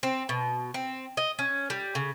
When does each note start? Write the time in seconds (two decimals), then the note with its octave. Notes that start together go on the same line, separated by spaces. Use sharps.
0.03 C4
0.29 B2
0.74 C4
1.17 D#5
1.39 C#4
1.70 G3
1.95 C#3